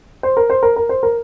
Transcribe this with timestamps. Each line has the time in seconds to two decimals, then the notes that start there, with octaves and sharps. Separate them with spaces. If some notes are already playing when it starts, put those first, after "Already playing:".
0.23 C5
0.37 A#4
0.50 C5
0.63 A#4
0.76 A#4
0.89 C5
1.03 A#4